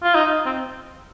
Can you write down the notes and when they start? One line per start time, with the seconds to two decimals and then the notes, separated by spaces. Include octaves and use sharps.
0.03 F4
0.15 D#4
0.46 C4